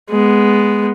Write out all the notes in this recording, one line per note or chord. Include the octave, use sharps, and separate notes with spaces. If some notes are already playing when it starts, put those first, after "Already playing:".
G#3 B3